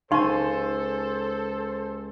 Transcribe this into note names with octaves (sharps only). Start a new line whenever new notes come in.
C#2 D#4 A4 C5 F5 G#5 C6 C#6